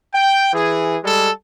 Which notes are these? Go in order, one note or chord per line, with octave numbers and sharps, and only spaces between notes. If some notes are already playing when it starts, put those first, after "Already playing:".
G5
E3 G#4
G3 G#3 A4